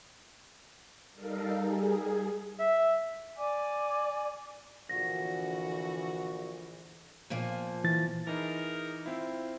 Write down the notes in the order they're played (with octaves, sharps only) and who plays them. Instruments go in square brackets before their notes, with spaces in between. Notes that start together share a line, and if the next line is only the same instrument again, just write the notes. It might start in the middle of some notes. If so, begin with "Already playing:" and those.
[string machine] G3 D#4 A4 A#4 F5
G3 G#4
G#4
[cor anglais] E5
[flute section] D5 G#5 D6
[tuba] A#1 [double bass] D3 E3 [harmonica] F#4 [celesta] A#6
[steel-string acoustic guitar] A#2 F3 A#3
[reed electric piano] E3 A6
[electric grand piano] E3 D#4 [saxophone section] G#4 A#4
[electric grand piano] C4 E4 [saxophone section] F4 C5